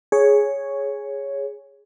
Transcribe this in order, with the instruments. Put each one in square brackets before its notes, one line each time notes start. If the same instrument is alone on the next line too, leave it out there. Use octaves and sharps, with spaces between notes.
[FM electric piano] G#4 C#5